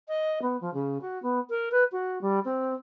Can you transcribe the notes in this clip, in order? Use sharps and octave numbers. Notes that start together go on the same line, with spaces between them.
D#5
B3
F3
C#3
F#4
B3
A#4
B4
F#4
G3
C4